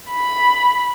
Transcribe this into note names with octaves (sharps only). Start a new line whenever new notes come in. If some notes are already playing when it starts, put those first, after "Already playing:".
B5